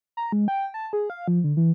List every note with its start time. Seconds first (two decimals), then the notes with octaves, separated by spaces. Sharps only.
0.17 A#5
0.32 G#3
0.48 G5
0.74 A5
0.93 G#4
1.10 F5
1.28 F3
1.44 D3
1.57 E3